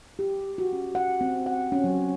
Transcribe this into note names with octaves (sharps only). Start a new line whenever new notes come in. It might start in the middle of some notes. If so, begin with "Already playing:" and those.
G4
F#4
C#4
F#5
C4
F#5
C#4
F#3